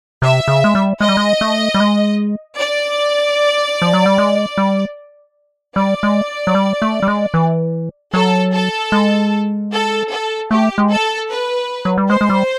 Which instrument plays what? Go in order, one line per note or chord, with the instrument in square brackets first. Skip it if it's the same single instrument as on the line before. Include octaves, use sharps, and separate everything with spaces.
[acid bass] C3 [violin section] E5
[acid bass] C#3
G#3
G3
[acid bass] G#3 [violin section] D#5
[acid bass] G3
G#3
A3
G3
G#3
[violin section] D5
[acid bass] F3
F#3
G3
G#3
G3
[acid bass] G3 [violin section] D5
[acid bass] G#3
F#3
G3
A3
G3
G#3
E3
[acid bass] F#3 [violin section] A4
[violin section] A4
[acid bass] G#3
[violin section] A4
A4
[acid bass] A3 [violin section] G4
[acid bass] G#3
[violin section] A4
B4
[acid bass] F#3
G3
[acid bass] G#3 [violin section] C5
[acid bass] G#3
G3